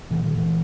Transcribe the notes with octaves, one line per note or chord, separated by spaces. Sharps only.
A#2 E3
D#3
E3